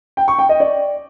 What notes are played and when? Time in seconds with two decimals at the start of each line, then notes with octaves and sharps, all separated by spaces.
0.17 G5
0.28 C#6
0.39 G5
0.49 D#5
0.60 D5